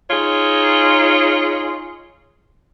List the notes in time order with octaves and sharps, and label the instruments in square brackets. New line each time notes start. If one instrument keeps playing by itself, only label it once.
[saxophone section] D#4 F4 G#4 C#5